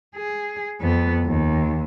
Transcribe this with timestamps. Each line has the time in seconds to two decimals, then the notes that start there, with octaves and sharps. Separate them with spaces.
0.15 G#4
0.80 F2 B3
1.25 D#2